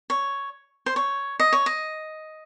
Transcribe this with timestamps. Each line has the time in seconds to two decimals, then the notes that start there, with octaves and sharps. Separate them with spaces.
0.10 C#5
0.86 C5
0.96 C#5
1.40 D#5
1.53 C#5
1.66 D#5